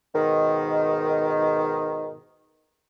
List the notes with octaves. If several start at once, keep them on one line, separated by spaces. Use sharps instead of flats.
G#2 B2 D#3